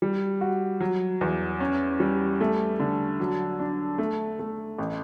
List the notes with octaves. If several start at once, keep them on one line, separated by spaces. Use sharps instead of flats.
G3
F#4
F#3
E2
C#4
G3
A3
D3
F#3
D4
A3
A3
A1